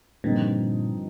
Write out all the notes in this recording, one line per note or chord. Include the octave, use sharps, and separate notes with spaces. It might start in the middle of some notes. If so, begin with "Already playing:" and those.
G2 A#2 D3 F3 C4 D#4